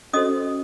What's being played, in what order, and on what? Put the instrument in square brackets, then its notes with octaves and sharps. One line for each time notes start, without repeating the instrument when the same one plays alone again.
[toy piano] C#4 F#4 A4 C5 D#5 D#6